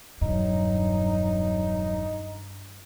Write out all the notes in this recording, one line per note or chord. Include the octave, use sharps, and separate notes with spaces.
E1 G2 F#3 D#4